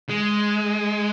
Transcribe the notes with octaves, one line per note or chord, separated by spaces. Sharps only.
G#3